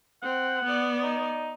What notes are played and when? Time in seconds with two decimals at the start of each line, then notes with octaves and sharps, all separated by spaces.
0.23 C4 F#5
0.64 B3 D5
1.03 D#4